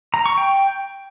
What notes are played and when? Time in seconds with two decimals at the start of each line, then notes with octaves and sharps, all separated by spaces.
0.14 A#5
0.26 C#6
0.38 G5